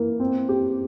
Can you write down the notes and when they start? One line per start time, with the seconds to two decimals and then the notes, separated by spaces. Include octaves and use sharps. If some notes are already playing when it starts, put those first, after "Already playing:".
Already playing: E3 A#3
0.20 C4
0.49 G4